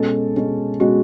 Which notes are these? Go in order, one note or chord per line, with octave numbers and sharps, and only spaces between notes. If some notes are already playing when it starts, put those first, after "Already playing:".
Already playing: B2 G#3 C#4 A4
B2 G#3 C#4
B2 G#3 C#4 F#4